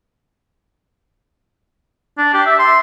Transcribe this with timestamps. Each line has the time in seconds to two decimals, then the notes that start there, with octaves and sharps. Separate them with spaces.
2.18 D4
2.34 G4
2.46 E5
2.59 C6